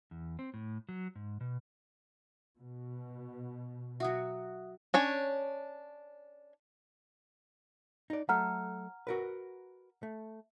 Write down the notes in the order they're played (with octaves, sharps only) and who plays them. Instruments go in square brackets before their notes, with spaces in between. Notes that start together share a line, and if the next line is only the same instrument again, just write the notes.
[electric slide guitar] E2
C4
A2
F#3
G#2
B2
[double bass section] B2
[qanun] F#3 F#4 [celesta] E5 D#6
[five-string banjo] C#4 D4 C#5
[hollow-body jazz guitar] D#4 D5
[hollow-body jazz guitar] F#3 A3 A4 [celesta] F#5 A#5 F6
[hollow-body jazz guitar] F#4 A#4 B4
A3